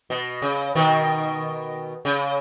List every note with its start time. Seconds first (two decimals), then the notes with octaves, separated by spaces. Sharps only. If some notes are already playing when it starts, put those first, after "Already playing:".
0.10 B2
0.42 C#3
0.75 B2 D#3
2.05 C#3